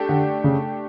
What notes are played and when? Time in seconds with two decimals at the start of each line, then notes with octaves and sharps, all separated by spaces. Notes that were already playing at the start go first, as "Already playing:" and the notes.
Already playing: A3 D4 G4
0.09 D3
0.44 C#3